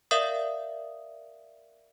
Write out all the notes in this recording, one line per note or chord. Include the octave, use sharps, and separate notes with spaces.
A#4 D5 E5 F5 D#6